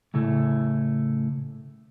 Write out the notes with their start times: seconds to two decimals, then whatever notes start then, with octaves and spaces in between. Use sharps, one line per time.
0.14 A2 C#3 A3 E4